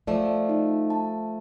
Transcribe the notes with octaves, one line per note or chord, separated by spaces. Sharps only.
F3 A3 D5
D#4
A5